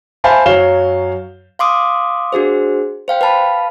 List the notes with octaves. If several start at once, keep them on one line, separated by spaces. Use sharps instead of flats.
C5 E5 F5 G#5 A5 B5
F#2 F#3 C#5 F5 E7 G7
F5 C6 D6 D#6
D4 F#4 G#4 C5
C5 F5 G5
B4 F5 A5 B5